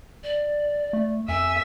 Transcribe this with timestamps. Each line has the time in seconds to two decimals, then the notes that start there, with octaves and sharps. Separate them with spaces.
0.23 D5
0.93 A3
1.28 F2 E5 G#5